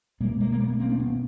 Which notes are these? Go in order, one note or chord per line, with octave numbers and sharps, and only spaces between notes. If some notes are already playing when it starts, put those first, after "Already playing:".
B2 G#3 A#3
G#3 A#3
A#3
A3 B3
A#3 C4
D4
B3 C#4